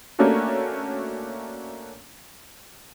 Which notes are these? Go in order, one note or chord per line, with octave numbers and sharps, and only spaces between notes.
A3 A#3 C#4 D4 F#4 A4